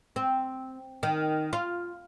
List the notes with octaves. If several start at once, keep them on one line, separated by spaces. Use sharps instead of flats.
C4
D#3
F4